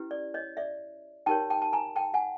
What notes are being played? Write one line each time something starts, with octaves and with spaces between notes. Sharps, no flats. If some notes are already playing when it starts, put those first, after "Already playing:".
Already playing: C#4 E4 G4 B4
D5
C#5 D#5
D5 E5
D#4 G4 A#4 C#5 G5 A5
G5 A5
A5
G#5 A#5
G5 A5
F#5 G#5